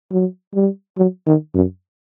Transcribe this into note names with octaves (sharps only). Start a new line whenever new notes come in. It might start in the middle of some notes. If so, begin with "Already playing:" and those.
F#3
G3
F#3
D#3
F#2